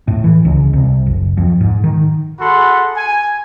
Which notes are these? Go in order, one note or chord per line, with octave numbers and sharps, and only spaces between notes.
A2
E3
C#2
C2
F#1
F2
G#2
D#3
F#4 G#4 A4 F#5 B5 C6
G#5